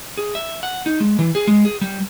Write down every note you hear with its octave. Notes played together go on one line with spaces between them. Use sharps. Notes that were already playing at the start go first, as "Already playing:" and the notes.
G#4
E5
F#5
D#4
G#3
E3
G#4
G#3
G#4
G3